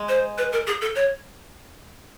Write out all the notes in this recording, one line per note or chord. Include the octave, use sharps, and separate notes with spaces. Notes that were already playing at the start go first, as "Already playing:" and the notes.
Already playing: G#3
C5
B4
A#4
G#4
A4
C#5